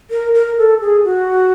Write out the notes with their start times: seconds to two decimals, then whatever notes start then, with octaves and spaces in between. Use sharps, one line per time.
0.11 A#4
0.34 A#4
0.58 A4
0.81 G#4
1.04 F#4